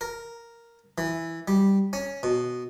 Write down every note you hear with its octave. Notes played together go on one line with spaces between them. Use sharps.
A#4
E3
G3
C#4
B2